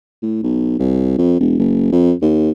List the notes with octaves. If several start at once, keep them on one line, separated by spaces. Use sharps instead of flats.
A2
B1
C2
F2
E1
F#1
F2
D#2